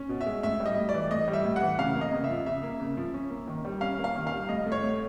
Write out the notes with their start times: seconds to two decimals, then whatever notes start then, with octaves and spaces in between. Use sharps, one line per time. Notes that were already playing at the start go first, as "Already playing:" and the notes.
Already playing: C#4
0.09 B2
0.21 E5
0.26 G#3
0.43 A2 E5
0.60 G3
0.66 D#5
0.77 A2
0.89 D5
0.94 E3
1.11 A2 D#5
1.28 G3
1.33 E5
1.45 A2
1.56 F#5
1.62 E3
1.78 C#3 F5
1.95 A#3
2.01 D#5
2.12 C#3
2.24 E5
2.29 F3
2.46 C#3 E5
2.63 A#3
2.80 C#3
2.97 F3
3.14 C#4
3.30 A#3
3.48 D#3
3.65 G3
3.81 C#4 F5
3.98 A#3
4.04 F5
4.15 D#3
4.27 F5
4.32 G3
4.49 A2 D#5
4.66 A3
4.72 C#5
4.83 A2